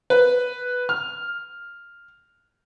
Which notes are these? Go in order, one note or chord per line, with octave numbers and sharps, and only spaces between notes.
B4
F6